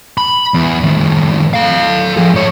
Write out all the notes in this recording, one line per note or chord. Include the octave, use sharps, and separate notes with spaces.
B5
E2
A2 D#3
A4 F5
F3 G#4
G#2 C#5